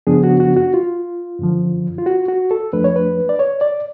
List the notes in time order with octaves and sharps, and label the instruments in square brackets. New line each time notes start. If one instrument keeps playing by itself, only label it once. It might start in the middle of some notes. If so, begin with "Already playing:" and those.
[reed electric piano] F#2 C#3 F3 B3 D4 G#4
F#4
F#4
F#4
F4
F#2 D3 F3
F4
F#4
F#4
A4
F2 F3 A3 D4 B4
C#5
B4
D5
C#5
D5